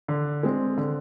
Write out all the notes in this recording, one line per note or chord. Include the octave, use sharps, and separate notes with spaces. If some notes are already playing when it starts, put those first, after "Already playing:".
D3
G#3 C4
D3